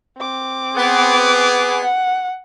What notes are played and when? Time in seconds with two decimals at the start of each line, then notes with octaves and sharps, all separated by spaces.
0.17 C4 D6
0.76 B3 G#4
1.82 F#5